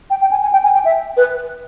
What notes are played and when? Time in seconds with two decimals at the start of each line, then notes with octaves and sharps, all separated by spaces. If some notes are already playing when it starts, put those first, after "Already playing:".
0.10 G5
0.21 G5
0.31 G#5
0.42 G#5
0.52 G5
0.63 G#5
0.74 G5
0.85 E5
1.17 B4